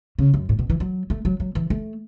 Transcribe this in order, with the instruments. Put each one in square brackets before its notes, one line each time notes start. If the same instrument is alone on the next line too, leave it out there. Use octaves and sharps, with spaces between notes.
[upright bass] C#3
F#2
A2
B2
E3
F#3
A3
F#3
F#3
E3
A3